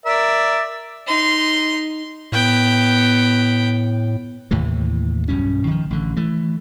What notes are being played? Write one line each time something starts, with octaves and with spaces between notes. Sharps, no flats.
A#4 D5 E5
D#4 C6
A2 B3 G5
D#2 A2 C3 E3
B1 G2 B2 C#4
D#3 F3
A1 D3
E3 A3